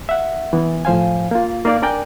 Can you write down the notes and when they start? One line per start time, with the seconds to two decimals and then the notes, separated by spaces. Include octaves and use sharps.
0.09 E5 F#5
0.53 E3 B3
0.85 A2 F3 C5 F5 G#5
1.31 A#3 F4
1.65 A#3 D#4 A#4 D5
1.82 D4 A#4 D5 G5 G#5